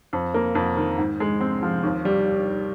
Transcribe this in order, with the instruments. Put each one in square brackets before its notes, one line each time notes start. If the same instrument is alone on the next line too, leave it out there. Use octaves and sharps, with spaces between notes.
[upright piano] F2
A#3
F2
D#3
G#2
G#3
C4
F3
D#2
G3